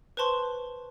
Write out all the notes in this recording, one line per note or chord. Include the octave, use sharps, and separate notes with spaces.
B4 C5 A5 C6 C#6